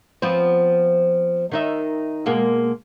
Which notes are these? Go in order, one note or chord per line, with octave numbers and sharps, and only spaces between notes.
F3 B3 C4
D#3 D#4 E5
B2 G#3 A#3